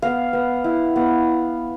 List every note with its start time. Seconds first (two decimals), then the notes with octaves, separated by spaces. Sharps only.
0.02 B3 F5
0.33 B3
0.64 E4
0.96 B3